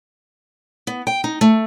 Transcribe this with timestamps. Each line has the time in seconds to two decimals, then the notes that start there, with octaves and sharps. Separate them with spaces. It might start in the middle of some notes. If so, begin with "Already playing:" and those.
0.87 B3
1.07 G5
1.24 D#4
1.41 A3